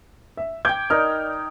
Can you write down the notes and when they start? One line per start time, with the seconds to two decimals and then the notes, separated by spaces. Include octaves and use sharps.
0.37 E5
0.65 G5 D6 G6 G#6 G7
0.90 D#4 A#4 D5 F6